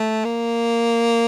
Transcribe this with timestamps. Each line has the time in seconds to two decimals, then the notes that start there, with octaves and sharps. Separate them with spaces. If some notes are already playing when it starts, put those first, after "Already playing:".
Already playing: A3
0.25 A#3